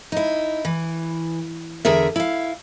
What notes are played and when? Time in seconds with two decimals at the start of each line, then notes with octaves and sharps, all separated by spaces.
0.12 D#4 E4
0.65 E3
1.85 E2 D3 G#4 A#4 E5
2.16 E4 F5